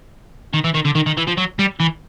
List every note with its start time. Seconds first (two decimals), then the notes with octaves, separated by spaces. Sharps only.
0.54 D#3
0.64 E3
0.74 D#3
0.85 D3
0.95 D#3
1.06 D#3
1.17 E3
1.27 F3
1.37 F#3
1.59 G3
1.80 E3